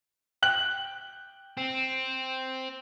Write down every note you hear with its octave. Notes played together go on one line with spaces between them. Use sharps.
G5 F#6 F#7
C4